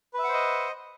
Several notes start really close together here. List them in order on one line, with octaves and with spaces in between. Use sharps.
B4 E5 F#5 C5 D#5